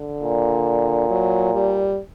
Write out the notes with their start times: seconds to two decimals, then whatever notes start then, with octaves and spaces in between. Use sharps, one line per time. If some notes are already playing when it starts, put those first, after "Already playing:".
Already playing: D3
0.23 A#2
1.10 F#3
1.54 G3